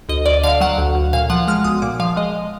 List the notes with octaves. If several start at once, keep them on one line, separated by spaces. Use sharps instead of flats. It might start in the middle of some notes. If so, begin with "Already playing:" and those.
D2 D#5
D2 D5
D3 F5
F#3 F#5
D2
D2
A#2 F5
F3 F#5
G#3 F6
B1 D#6
A#2 D6
F3 F5
G#3 D#5